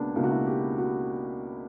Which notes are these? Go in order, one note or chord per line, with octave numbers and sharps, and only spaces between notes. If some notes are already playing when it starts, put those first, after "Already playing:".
Already playing: C#2 B2 A#3 B3 D4
C#2 B2 A#3 E4
F#4
E4
G4
F#4